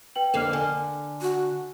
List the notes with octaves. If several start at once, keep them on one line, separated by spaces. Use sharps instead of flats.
B4 G5 F#7
F2 D3 A#3 F6 C7 F7
D3 G#5 F6
F#4